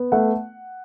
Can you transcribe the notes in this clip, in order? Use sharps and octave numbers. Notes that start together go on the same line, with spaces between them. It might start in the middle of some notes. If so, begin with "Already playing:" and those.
Already playing: B3
A3 F#5